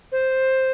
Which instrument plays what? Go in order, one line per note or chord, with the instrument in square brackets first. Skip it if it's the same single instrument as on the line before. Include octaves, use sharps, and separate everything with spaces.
[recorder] C5